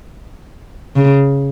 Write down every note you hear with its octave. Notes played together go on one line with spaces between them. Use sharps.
C#3